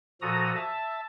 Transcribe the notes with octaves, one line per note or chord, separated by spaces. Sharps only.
A#2 F3 F#4 A4 A#5 D#6
E5 A5